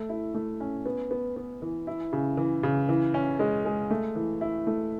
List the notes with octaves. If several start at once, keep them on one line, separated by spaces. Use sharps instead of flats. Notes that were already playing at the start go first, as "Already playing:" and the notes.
Already playing: A3
E4
A3
C#4
B3
B3
B3
E3
E4
C#3
E3
C#3
E3
C#4
G#3
G#3
A3
E3
E4
A3